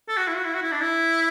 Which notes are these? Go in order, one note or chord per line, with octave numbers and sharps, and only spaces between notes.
A4
F#4
E4
F#4
E4
F#4
E4
D4
E4